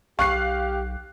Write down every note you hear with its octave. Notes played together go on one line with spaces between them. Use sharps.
B1 G4 F5 C#6 F#6 C7